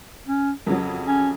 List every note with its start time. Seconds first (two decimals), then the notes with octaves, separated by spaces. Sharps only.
0.27 C#4
0.66 F2 C#3 F#3
1.07 C#4